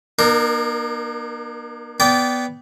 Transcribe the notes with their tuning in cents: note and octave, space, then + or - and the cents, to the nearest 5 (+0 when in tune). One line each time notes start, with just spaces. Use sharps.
A#3 +45 D#4 -45 A#4 +0
B3 +0 D5 -20 G5 -10